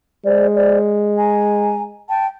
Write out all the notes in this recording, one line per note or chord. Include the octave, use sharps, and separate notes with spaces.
G#3 C5 D5
C5 D5
G#5 A#5
G5 A5